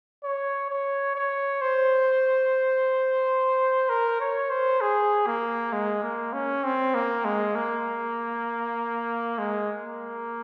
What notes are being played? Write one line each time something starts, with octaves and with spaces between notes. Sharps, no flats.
C#5
C#5
C#5
C5
A#4
C#5
C5
G#4
A#3
G#3
A#3
C#4
C4
A#3
G#3
A#3
G#3
A#3